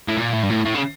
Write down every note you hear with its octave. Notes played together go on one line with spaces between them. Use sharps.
A2
A#2
A2
G2
A2
A2
C#3